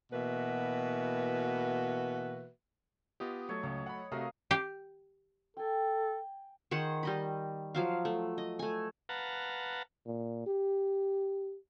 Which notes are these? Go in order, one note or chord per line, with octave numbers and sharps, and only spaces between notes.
B2 E3 A#3 F#4 B4 E5
B3 F4 G4 D#5
F#3 A3 A4 C#5
C#2 C#5
F#5 B5
C3 A3 F#4 A#4 D#5 F5
G4
A4 G5 G#5
D#3 G#4 C5 F#5
G3 D#5 B5
F3 F#3 F5
A3
D#5
A3 G#5
B4 F5 F#5 A5 A#5
A#2
G4